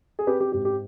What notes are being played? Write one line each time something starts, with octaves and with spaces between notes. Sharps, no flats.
G#4
C4 G4 B4
G4
G#2 G4
G4